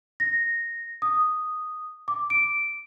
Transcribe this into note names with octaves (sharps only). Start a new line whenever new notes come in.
A#6
D#6
D6
D7